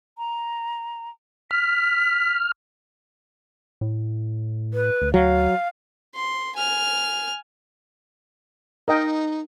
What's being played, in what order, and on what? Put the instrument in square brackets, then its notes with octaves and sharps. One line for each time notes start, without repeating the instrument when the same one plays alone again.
[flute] A#5
[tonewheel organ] F6 [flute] B6
[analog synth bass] A2
[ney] B4
[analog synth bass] D2
[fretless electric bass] F#3 [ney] F5
[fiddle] C6
G#5 F6
[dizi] D#4 [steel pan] A#4 D#5 G5